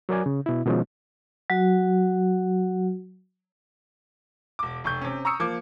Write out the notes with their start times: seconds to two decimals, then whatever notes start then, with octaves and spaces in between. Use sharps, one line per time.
0.09 F#3 A#4 D5 G#5
0.26 C#3
0.46 B2 E4
0.65 B2 D#3 F3 G#3 C#4
1.50 F#3 F#4
4.59 E1 D6
4.84 F1 C#6 G6
5.01 C3 C#4
5.25 A#5 C#6 D#6 E6 C#7
5.40 F3 A#3 D6